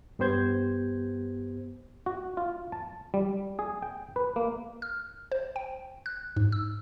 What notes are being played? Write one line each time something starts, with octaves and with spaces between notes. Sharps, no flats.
G2 B3 G4 C5 G6 G#6
F#4
F4
A5
G3
G#4
G5
B4
A#3
F6
C5
G5
F#6
G#2
E6